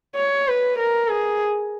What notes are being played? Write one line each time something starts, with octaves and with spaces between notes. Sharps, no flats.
C#5
B4
A#4
G#4